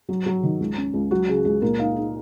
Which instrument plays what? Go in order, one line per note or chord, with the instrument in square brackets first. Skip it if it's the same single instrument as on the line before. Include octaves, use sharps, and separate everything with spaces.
[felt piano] F#3
F#3
D#3
C#2
C#4
C#2
F#3 F#4
C#3 G#4
C#2 G#4
A#2 A#4
D#4 F5
D#4